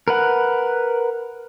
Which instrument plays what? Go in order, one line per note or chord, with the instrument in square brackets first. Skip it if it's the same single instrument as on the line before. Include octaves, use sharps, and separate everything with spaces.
[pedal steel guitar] A#4 B4 F#5